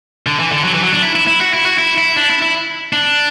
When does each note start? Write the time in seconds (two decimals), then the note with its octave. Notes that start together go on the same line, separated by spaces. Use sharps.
0.27 D3
0.40 E3
0.52 D3
0.64 F#3
0.74 E3
0.84 F#3
0.93 D4
1.03 E4
1.15 E4
1.27 E4
1.41 F#4
1.54 E4
1.66 F#4
1.78 E4
1.98 E4
2.16 D4
2.30 E4
2.42 E4
2.93 D4